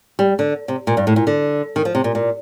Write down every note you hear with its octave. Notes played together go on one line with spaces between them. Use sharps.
G3
D3
C3
A#2
G2
A2
A#2
D3
D#3
F3
C3
A#2
A#2